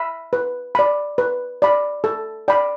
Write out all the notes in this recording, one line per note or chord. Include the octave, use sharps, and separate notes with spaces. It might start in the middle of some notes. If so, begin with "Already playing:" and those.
Already playing: E5 B5
B4
D5 B5
B4
D5 B5
A4
D5 G5 B5